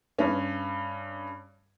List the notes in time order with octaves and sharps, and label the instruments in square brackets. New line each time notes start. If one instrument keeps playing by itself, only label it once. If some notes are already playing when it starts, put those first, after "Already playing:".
[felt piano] G2 C#4